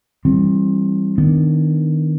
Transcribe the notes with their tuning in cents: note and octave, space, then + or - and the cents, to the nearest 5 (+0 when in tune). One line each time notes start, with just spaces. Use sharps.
E3 +0 G3 +0 C4 +25
D#3 +0 B3 +15 D4 +0